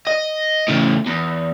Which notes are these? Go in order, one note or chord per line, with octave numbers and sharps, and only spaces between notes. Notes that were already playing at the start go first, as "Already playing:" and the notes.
D#5
A2 C#3
E2